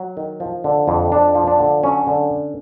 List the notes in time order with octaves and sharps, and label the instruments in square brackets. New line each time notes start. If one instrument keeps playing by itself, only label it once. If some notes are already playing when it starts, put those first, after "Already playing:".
Already playing: [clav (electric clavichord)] F#3
D#3
F3
D3
F2
F2 D4
F3
D4
D3
F#3 C#4
D3